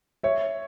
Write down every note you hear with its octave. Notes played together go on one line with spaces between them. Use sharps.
C#5 E5